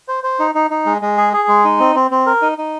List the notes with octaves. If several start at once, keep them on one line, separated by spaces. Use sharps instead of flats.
C5
C5
D#4
D#4
D#4
G#3
G#3
G#4
G#4
G#3
D#4
C4
C4
C4
A#4
D#4
D#4